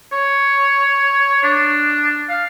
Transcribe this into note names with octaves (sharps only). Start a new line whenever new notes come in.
C#5
D4
F5